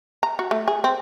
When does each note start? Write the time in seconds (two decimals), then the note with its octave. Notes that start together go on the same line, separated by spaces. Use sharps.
0.23 A#5
0.39 F#4
0.51 A3
0.68 G#4
0.84 C4